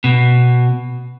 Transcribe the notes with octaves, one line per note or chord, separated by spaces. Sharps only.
B2